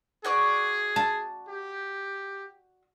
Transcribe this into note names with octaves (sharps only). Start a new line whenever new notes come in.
F#4 G#4 D5 C#6
A5
G4